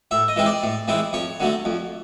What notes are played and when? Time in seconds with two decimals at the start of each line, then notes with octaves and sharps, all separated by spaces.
0.11 A2 E5
0.28 D#5
0.36 E3 G#3 C4 E4
0.46 D5
0.63 A2
0.88 E3 G#3 C4 E4
1.13 F2 C#5
1.40 D3 F#3 A3
1.65 F2